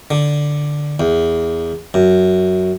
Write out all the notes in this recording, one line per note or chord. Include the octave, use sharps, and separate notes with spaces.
D3
E2
F#2